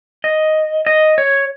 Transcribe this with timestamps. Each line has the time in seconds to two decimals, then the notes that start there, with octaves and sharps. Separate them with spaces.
0.24 D#5
0.86 D#5
1.18 C#5